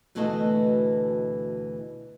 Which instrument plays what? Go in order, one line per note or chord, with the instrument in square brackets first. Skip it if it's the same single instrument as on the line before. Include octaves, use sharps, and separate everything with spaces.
[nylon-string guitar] D2 B2 E3 A3 F#4 D#5